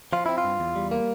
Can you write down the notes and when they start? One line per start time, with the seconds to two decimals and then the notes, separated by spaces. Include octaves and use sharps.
0.13 F3 F4
0.26 C4 E4
0.38 F4
0.44 G2
0.60 E2
0.76 G3
0.91 A#3